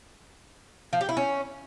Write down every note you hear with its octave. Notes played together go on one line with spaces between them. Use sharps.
F3
G4
E4
C#4